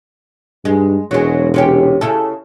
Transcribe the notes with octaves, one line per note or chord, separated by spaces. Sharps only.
G2 G#3
E1 F#3 G#3
C3 C#4 G4
C#3 E4 A4